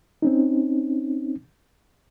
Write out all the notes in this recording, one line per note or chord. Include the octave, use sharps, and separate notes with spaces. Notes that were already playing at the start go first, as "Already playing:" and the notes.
C4 C#4 D#4